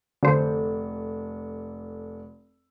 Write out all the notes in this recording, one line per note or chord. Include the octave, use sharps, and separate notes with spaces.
F1 D3 A4 C5